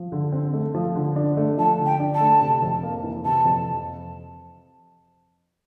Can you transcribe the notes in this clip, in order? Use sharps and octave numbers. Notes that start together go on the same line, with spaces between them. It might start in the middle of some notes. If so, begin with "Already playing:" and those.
Already playing: F3
D3
C4
A3
F3
D3
D4
A3
F3 A5
D3
G5
D4
A5
A3
C3
F2
A#3
E3
C3 A5
F2